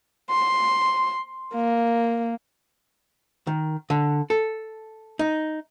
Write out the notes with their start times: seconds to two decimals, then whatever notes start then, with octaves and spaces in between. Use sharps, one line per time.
0.30 C6
1.54 A#3
3.47 D#3
3.90 D3
4.30 A4
5.19 D#4